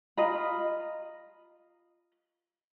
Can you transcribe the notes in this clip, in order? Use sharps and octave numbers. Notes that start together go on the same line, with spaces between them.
F4 D#5 A#5 B5